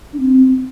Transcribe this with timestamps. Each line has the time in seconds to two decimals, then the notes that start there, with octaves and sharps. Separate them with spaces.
0.13 D4
0.19 C4